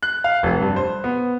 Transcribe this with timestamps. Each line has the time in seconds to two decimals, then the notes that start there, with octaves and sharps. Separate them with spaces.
0.03 F#6
0.24 F5
0.43 F1
0.61 G2
0.76 C5
1.04 B3